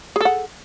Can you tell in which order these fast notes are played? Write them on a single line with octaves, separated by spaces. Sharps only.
G#4 A4 F#5